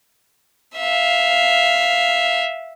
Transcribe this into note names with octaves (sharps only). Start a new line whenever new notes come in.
E5 F5